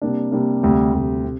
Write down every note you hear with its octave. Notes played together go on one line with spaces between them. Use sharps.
C3 G3 A#3 D4
C3 G3 A#3 D4
D2 C3 G3
D2 C3 G3
C3